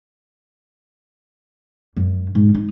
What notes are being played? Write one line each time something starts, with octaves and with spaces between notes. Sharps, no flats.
F#2
G#2
D#4